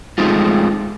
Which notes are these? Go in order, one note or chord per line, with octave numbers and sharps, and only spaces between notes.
G#3 A3 C4 D#4 F4